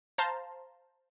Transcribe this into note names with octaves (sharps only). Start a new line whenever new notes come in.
C5 F5 A5 A#5 C6